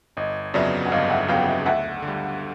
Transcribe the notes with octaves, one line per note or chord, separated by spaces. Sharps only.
G1 D#5
F2 C#3 F#3 B3 D5 E5
F#5
G1 D#5 F5
E5 F#5
F2 C#3 F#3 B3 F5 G5
E5 F#5
D2 E5 F#5
D3
G3